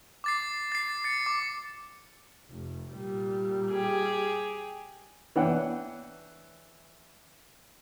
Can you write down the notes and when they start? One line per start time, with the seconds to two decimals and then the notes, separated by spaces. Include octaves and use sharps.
0.24 D6 A6 C7
0.72 A6 C7
1.04 A6 C#7
1.26 D6
2.50 F1
2.90 A#2 G3
3.70 G4 G#4
5.36 E3 D4 C#5 F#5 G5